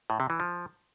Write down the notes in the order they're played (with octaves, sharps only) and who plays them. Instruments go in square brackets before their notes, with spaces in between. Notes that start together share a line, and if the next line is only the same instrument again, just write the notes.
[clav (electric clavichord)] A2
C3
E3
F3